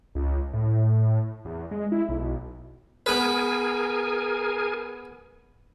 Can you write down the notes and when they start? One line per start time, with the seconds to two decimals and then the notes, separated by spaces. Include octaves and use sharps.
0.15 C#2
0.53 A2
1.45 E2
1.71 G#3
1.92 E4
2.09 B1
3.06 B3 G#4 A#4 B4 G#5